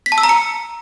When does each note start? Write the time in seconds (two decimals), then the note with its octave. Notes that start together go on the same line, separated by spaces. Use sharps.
0.06 B6
0.12 A5
0.18 E6
0.23 A#5
0.29 C#7